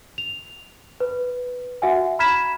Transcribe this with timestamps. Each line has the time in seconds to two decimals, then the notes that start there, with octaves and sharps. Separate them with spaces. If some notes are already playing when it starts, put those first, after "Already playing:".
0.18 F7
1.00 B4
1.82 F#4 E5 F#5 G#5
2.19 A#5 B5 F6 G#6 B6 E7